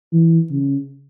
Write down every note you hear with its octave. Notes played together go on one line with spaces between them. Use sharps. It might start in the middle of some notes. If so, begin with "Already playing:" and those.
E3
C#3